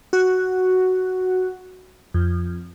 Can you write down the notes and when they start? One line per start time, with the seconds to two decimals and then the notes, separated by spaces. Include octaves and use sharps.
0.13 F#4
2.14 F2